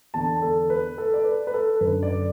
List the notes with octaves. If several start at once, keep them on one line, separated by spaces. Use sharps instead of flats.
E2 D3 A5
A4
B4
A4
D5
B4
B4
A4
F#2 D3 B4
D5